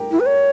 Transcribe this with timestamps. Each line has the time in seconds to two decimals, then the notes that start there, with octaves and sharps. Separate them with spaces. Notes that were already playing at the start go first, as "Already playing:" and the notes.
Already playing: G4 A#4
0.11 E4
0.20 B4
0.26 C#5